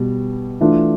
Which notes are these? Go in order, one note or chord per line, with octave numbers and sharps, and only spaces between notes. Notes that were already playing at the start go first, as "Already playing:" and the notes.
Already playing: B2 G3
E3 A3 D4 F4